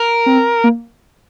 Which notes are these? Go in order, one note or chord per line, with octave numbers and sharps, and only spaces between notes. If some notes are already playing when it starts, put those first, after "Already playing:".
Already playing: A#4
C4
A#3